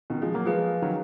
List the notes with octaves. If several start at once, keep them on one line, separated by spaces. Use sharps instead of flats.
B2 D#3
F3 G#3
F#3 A#3
F3 G#3 G#4 B4 F5
D#3 F#3